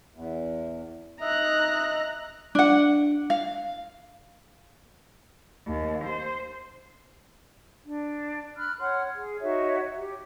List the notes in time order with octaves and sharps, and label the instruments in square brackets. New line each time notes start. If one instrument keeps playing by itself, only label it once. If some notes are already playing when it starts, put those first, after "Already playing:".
[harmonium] E2
[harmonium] D#4 D#5 E5 [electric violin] A#5 F#6
[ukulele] D4 F#5
F5
[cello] D#2
C5
[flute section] D4
B5 F6 F#6
C#5 F#5 C6 F6
G#4
D#4 F#4 C#5 E5
G4